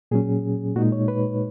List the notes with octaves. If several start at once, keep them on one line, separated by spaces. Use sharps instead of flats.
A#2 F#3 C#4 G#4
A#2 G#3 D#4 F#4
C#5
B4